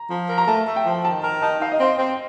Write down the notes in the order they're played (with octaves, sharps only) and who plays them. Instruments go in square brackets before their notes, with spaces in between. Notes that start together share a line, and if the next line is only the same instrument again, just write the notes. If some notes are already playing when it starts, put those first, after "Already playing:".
Already playing: [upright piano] A#5
[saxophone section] F3
A#4
[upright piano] A#5
[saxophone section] A3 [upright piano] A5
[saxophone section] A3
[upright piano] G5
[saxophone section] F3
[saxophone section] D#3 [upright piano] A5
[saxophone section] A#4 [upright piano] A#5
[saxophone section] D#4 [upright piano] A5
[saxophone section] D#4 [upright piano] F5
[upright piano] D#5
[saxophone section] C4 [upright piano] F5
[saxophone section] C4